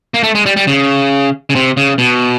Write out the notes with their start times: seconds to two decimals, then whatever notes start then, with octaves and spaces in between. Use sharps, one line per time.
0.14 A#3
0.23 A3
0.35 G#3
0.46 G3
0.56 G3
0.67 C#3
1.50 C#3
1.55 C3
1.77 C#3
1.98 B2